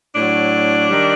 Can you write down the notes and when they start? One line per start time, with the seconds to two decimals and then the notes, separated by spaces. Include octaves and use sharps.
0.15 A2 F#3 D4
0.89 D#3 G3